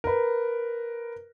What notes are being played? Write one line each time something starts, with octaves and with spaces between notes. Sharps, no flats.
A#4 B4